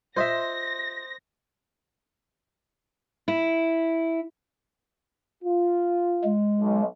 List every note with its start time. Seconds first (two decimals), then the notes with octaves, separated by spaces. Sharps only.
0.17 F4 C5 D#5 E5 A#6
3.28 E4
5.43 F4
6.24 G#3
6.59 B1